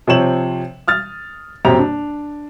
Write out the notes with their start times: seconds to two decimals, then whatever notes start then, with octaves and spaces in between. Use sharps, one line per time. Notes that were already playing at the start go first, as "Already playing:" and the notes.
0.07 C3 F3 C4 C#5 E7 F#7
0.88 D#6 F6 A6
1.65 D#1 F#2 C4 G4 A#5 F7
1.79 D4